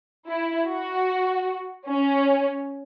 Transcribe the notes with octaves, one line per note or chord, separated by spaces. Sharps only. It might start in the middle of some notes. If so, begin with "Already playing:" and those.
E4
F#4
C#4